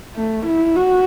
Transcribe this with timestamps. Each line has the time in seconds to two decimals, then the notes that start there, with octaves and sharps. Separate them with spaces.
0.15 A3
0.46 E4
0.76 F#4